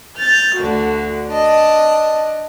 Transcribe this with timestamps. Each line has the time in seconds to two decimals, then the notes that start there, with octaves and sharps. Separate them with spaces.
0.16 F6 G6 A6
0.56 D2 D3 F#4
1.27 D4 D#5